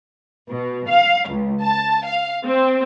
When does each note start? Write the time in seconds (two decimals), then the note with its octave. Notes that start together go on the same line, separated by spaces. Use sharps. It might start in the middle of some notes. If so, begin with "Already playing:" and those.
0.49 B2
0.89 F5
1.29 C#2
1.62 A5
2.05 F5
2.45 C4